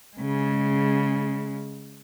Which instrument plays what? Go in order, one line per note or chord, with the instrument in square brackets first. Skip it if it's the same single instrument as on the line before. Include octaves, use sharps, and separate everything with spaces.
[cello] C#3 G#3